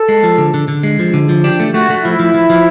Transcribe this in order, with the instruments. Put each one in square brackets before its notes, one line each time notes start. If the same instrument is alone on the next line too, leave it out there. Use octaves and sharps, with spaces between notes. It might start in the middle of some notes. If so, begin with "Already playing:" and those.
Already playing: [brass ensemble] A4
[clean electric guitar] G#3
F3
D3
D3
D3
G#3
F3
D3
F3
[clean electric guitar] D4 [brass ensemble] G4
[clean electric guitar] A3
[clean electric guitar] A3 [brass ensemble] F#4
[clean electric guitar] A3
[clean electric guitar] F3 [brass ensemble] E4
[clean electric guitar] F3
F3
F3